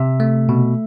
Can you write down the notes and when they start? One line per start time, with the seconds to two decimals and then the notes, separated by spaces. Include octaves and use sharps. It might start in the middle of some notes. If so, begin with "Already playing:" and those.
Already playing: C3 E5
0.20 A3
0.49 B2